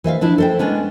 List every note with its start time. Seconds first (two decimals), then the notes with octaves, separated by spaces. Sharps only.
0.04 E3 C5 E5 F5
0.21 F3 D4 E4
0.38 A4 C5 G5
0.59 G#3 B3 C#4 D4